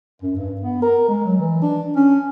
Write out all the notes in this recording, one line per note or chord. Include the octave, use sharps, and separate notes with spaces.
F#2
G2
B3
A#4
G#3
F#3
E3
D4
C#4